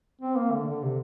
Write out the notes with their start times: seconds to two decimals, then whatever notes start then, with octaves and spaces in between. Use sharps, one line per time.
0.21 C4
0.36 A#3
0.52 D3
0.67 D3
0.82 C3